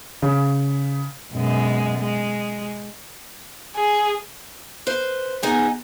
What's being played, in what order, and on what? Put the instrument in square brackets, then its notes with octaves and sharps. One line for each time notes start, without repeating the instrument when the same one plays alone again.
[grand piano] C#3
[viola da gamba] F#2 B2 G#3
G#3
[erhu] G#4
[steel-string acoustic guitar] B4 C5
B3 D#4 G#4 G#5